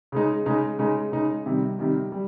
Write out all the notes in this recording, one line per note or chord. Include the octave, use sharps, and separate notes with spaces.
C#3 G#3 D#4
C#3 G#3 D#4
C#3 G#3 D#4
C#3 G#3 D#4
C3 D#3 G3
C3 D#3 G3
G3